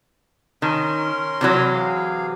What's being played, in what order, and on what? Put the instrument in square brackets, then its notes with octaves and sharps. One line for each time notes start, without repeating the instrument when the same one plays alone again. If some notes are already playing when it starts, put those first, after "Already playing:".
[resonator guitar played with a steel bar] D#3 [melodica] C#4 A#4 C6
[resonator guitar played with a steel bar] C3 E3 F#3
[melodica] G#4 F5